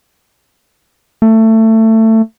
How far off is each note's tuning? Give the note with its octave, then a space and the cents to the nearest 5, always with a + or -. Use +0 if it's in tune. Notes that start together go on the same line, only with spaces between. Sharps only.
A3 +20